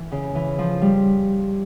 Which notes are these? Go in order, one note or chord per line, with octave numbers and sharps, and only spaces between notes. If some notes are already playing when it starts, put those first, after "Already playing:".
Already playing: E3
C#3
E3
F3
G3